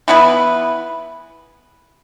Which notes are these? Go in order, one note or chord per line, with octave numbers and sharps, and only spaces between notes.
E3 B3 E4 B4